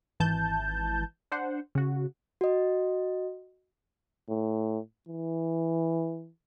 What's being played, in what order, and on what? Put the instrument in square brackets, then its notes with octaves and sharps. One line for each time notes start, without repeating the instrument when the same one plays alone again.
[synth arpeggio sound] G#1 E3 A5 G6
D4 C5 F#5
C#3 F#4
[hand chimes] F#4 D#5
[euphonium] A2
E3